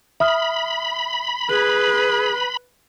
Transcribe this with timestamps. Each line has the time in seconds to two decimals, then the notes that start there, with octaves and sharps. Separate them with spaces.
0.20 E5 B5 D#6 F6
1.49 G#4 B4 F#7